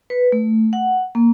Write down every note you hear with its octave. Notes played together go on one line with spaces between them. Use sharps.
B4
A3
F#5
A#3